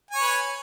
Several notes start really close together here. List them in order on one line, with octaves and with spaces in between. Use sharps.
G#5 C#5 B4